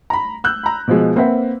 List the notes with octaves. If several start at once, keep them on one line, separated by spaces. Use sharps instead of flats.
A#5 B5
E6 F#6 G6
A#5 B5
B2 F3 G#3
A#3 C4 B4 C5 E5 F#5